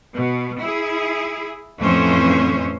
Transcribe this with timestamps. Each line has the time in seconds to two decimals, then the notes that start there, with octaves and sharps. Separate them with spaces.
0.14 B2
0.59 E4 G#4
1.78 F2 A2 E3 C#4 C5